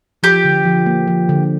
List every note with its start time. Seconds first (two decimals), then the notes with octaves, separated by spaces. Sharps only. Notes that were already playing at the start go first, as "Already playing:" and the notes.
0.23 F3 G4
0.44 D3
0.65 F3
0.86 A#3
1.07 F3
1.29 D3